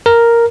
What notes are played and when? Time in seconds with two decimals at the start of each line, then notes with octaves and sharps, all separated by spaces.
0.06 A#4